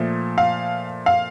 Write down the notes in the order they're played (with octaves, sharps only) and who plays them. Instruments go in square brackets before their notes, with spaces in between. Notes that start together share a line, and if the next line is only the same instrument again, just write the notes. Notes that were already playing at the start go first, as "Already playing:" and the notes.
Already playing: [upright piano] A#2 F3 A3
F5
F5